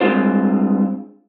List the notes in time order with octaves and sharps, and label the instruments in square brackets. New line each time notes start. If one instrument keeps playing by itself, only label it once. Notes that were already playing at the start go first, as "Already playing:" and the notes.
[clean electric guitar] G2 G3 G#3 C4 F4 C5